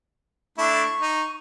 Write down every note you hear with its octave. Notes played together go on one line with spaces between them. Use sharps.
A3 D4 E4 C#6
D#4